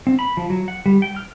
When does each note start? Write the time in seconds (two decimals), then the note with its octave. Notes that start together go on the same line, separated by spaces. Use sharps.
0.07 C4
0.19 B5
0.37 F3
0.50 F#3
0.68 F#5
0.86 G3
1.02 G5
1.16 F6